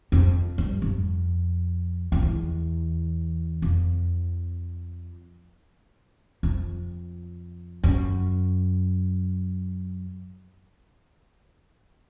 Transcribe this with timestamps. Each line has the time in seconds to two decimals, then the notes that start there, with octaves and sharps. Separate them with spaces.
0.12 F2
0.58 G2
0.82 F2
2.12 F2
2.22 E2
3.62 F2
6.43 F2
7.83 F#2